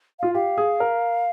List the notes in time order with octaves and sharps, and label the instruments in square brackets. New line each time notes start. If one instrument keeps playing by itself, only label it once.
[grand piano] F4 [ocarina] F5
[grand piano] G4 [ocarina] F5
[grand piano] G#4
A#4